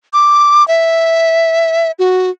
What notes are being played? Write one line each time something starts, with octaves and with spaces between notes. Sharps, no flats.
D6
E5
F#4